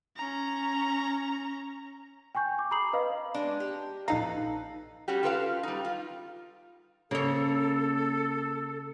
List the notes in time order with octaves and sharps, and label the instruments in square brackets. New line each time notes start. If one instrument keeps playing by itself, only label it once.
[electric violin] C#4 A#5
[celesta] G5 G#5 C#6 G6
D6
A#5 B5 D6 D#6 C7 F#7
B4 D#5 F5 B5
[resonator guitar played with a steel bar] G#3 D4
G4
[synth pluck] A#1 D#4 A#5 [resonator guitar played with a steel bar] A4 B4 F5
[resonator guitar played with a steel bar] G3 C#4 F#4 G4
F4 G4 A4 B4 D#5 F5
G3 D#4
F4
[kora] C#3 [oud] A#3 C#5 [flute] A4